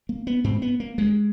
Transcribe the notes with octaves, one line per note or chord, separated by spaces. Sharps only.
A#3
B3
G#2 C4
B3
A#3
G2 G#3